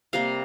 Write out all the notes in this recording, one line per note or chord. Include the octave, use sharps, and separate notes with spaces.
C3 G3 A#3 F5